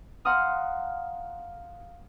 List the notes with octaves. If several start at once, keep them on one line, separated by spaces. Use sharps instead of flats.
F5 F#5 A#5 C6 D#6 F6